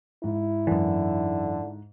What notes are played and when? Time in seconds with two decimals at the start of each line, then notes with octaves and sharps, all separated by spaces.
0.24 G#2 E4
0.67 F#2 D3 E3